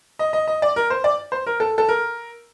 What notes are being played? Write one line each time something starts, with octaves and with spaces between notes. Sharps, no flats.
D#5
D#5
D#5
D5
A#4
C5
D5
C5
A#4
A4
A4
A#4